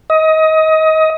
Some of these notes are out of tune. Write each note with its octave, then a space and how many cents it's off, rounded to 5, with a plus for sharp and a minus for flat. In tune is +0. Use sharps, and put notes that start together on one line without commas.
D#5 +25